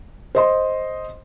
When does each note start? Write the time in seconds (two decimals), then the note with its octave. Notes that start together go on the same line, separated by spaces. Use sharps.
0.35 C5 D#5 C6